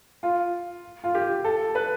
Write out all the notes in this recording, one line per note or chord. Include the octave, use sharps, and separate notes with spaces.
F4
F4
G4
A4
B4